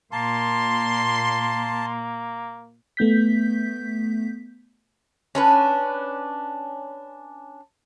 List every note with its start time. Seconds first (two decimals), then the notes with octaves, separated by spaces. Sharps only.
0.12 A#2 A#3 A5 C6
2.97 A3 B3 G6 B6
5.35 C#4 D4 B4